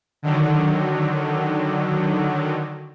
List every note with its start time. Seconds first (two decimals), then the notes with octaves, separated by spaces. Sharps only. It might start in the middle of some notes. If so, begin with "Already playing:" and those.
0.23 D3 D#3 F#3